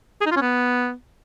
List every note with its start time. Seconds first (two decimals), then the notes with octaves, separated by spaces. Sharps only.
0.21 G#4
0.26 D#4
0.31 F4
0.36 C#4
0.42 B3